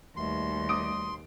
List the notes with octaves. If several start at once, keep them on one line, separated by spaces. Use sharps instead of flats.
D#2 B2 G3 A3 C6
D6 D#6 D7